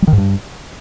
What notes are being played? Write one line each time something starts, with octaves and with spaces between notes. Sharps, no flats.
G3
D#3
G#2
G2